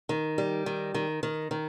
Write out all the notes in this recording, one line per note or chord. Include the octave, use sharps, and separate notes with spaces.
D#3
G3
D#3
D#3
D#3
D#3